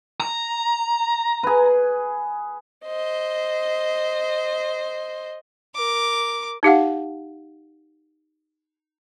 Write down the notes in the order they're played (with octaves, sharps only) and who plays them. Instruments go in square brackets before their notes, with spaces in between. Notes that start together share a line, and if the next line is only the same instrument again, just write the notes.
[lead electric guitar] A#5
[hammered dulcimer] G#4 B4
[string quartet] C5 D#5
[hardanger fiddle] A#4 D6
[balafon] D#4 G4 F5 F#5